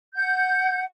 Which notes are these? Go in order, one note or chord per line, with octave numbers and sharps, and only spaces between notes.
F#5 G6